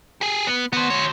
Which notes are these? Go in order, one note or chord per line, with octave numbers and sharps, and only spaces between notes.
G4 G#4
B3
B3 F#4 C5
D2 C#5